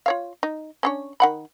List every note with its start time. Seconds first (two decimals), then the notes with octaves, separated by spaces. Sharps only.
0.06 F4 C#5 F5
0.43 D#4
0.83 C#4 D4 C#5
1.20 D#3 F#5 B5